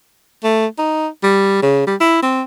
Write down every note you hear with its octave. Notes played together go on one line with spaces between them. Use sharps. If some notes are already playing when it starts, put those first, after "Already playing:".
A3
D#4
G3
C#3
G3
E4
C4